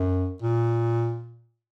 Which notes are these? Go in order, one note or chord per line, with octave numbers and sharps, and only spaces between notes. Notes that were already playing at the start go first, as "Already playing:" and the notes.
Already playing: F#2
A#2